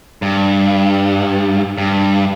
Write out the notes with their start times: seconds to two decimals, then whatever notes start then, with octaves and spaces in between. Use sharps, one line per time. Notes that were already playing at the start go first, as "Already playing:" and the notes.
0.22 G2
1.78 G2